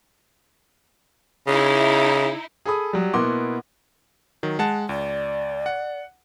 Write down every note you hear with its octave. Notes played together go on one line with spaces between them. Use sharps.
C#3 D#4 E4
G#4 A4 B5 D#6
F#3 G3
B2 A#3 B3 E4 C6 D6
D#3 F#3
G#3 F#5 A5
C#2 D5
F#5